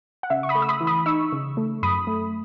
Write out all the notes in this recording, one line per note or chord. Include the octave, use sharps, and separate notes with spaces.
F#5
C#3 E5
C#6
B5 D#6
A3
E6
B5 D#6
E3
B5 D#6
D#4 C#6 E6
C#3
A3
F#2 B5 D#6
A3